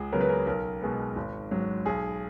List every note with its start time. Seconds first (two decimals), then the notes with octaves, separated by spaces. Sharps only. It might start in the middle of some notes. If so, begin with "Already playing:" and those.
Already playing: C#2 G#4
0.12 C#3 F#3 B3 A#4
0.21 B4
0.29 A#4
0.47 B1 A#4
0.82 B2 G#3 B3
1.16 G#1
1.51 G#2 F#3
1.86 B1 G#4